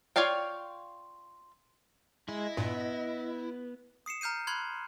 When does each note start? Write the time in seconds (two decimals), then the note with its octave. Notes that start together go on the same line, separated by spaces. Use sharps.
0.16 F4 C#5 D5 F5 G5
2.29 G#3 E4 D#5
2.57 G2 A#2 B3
4.06 D#6 C7 C#7 E7
4.21 A#5 F6 G6 C7 D#7
4.47 B5 C6 F#6 G#6